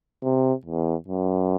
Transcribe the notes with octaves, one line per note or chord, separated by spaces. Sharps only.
C3
E2
F#2